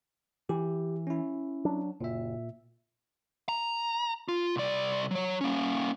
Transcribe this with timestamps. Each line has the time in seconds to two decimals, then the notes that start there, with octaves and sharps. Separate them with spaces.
0.49 E3 G4
1.07 C#4 E4
1.65 F#3 D4
2.01 F#1 A#2 E5
3.49 A#5
4.28 F4
4.56 C2 D5
5.11 F#3 C#5
5.41 A#3 C#4